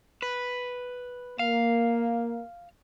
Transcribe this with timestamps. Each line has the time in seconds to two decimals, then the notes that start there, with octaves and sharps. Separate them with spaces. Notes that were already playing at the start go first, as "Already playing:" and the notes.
0.22 B4
1.39 A#3 F5